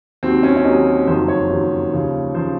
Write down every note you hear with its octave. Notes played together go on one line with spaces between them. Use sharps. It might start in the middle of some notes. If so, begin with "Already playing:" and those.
D#2 D#3 F#3 C4
C#4
C#4
D#2 D#3 F#3 D#4
F#1 F2 D#3 F#3 C5
C#5
F#1 F2 D#3 F#3
D#2 C#3 F3
C#3 F3 C5